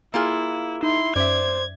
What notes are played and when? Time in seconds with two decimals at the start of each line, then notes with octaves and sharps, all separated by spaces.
0.14 A#3 E4 F4 G#4
0.83 D#4 E4 C6
1.16 F#2 C5 D5 E5 G#6